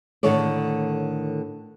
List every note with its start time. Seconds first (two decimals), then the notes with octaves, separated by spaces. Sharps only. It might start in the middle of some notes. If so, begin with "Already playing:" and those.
0.23 A2 D3 D#3 A4 C#5 D5